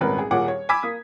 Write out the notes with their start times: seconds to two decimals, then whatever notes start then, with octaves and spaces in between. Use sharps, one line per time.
0.01 D#1 G#1 C#4 A#4 B4
0.18 G#4
0.31 D#1 A#2 G#4 C#5 F#5 D6
0.48 C#5
0.69 G#5 B5 D6 E6 G#6 B6
0.83 A#3 D#6